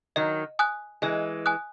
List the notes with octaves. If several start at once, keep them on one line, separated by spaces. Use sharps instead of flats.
D#3 F#3 D#5
G#5 D#6 F#6
E3 G#3 D#5
G#5 D#6 F#6